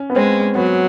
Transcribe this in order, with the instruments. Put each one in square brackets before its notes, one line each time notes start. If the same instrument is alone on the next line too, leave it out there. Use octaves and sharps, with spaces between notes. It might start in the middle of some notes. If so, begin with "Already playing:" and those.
Already playing: [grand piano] C#4
B3
[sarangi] G#3 [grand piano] C4
[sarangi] F#3 [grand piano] B3